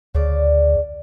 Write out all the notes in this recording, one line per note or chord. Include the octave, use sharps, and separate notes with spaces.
D2 C#3 D5